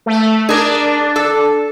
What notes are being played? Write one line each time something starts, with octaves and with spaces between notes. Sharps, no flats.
A3
D4 G#4 A#4
A4